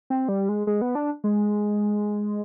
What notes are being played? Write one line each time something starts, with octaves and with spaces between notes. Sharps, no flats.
C4
G3
G#3
G#3
B3
D4
G#3